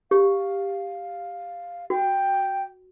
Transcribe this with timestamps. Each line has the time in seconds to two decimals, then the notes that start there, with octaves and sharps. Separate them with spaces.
0.11 G4 F5
1.90 F#4 G5